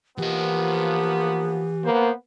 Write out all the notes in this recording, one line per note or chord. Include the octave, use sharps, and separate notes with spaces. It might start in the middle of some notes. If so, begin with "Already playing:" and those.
E3 F3 A#3 B3 G4 D#5
A#3 B3 C5